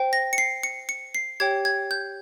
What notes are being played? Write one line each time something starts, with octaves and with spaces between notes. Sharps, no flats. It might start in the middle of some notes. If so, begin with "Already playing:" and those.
Already playing: C5 G5
A#6
C#7
C7
C#7
C#7
C7
G4 C#5 G5 G#6
G#6
G6